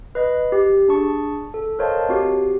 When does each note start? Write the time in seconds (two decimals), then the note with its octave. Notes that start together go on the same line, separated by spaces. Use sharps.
0.15 B4 D#5 F#6
0.52 G4
0.88 D4 G#4 A5 C#6
1.54 A4
1.79 A#4 C5 C#5 D#5 F5 A5
2.09 C4 F#4 G4